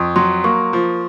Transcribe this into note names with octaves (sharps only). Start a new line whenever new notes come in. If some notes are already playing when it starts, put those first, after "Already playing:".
Already playing: F2 C6 C#6 D#6
F#3 C6
A#3 C#6
F3